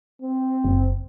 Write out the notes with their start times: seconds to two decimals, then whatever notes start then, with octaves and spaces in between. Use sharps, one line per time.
0.22 C4
0.64 F#1